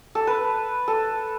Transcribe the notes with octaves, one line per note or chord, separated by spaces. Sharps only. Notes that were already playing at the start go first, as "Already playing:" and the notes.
A4
B4
A4